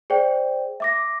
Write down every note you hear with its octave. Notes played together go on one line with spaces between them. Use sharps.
G#4 C5 D5 G5
E5 D6 A#6